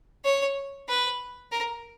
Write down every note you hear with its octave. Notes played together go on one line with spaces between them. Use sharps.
C#5
B4
A#4